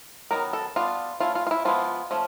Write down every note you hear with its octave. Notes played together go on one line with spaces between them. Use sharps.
D#3 F#3 B3 A#4
A4
G3 B3 D4 F4
A3 C#4 E4 F4
F4
F4
E4
F3 G#3 B3 E4 F4
F3 A3 C#4